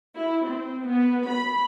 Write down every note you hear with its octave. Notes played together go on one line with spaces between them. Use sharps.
E4
C4
B3
B5